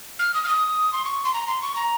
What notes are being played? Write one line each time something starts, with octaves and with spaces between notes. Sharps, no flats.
F6
D#6
F6
D#6
C6
C#6
C6
A#5
C6
C#6
A#5